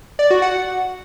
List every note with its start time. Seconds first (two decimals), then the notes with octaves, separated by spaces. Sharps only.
0.19 D5
0.31 F#4
0.42 F#5